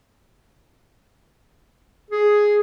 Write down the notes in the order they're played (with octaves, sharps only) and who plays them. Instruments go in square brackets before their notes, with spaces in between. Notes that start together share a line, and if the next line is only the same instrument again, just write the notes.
[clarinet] G#4